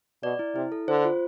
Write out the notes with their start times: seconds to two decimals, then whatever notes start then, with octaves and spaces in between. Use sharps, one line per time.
0.23 B2 D5
0.39 E4
0.55 C3 E4
0.72 A4
0.88 D3 C5
1.05 F4